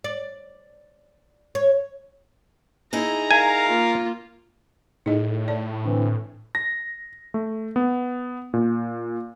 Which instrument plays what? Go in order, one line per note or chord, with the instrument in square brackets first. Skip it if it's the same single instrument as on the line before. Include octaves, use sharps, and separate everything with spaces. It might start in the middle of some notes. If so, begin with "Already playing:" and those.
[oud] D5
C#5
[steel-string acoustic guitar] D#4 E4 G#4 [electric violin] A#5
[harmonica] A#4 F5 [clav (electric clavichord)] G#5
[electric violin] A#3 F4
[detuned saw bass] A2 [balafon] D#4 G#4 D#5
[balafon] D5 A5
[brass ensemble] D3 E3 C4
[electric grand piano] A#6
A3
B3
A#2